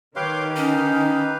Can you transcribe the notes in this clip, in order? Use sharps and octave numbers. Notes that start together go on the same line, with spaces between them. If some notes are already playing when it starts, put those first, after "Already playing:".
D#3 G4 B4 C#5 F5 C6 D6
C#4 D#4